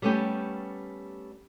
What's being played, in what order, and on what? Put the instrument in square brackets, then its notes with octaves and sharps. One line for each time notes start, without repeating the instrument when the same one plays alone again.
[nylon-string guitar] G3 A3 B3 C#4 G4